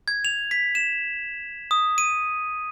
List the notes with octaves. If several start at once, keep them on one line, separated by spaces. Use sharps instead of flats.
G#6
F7
B6
E7
D#6
D#7